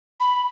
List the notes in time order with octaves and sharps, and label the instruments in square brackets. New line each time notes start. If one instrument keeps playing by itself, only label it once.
[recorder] B5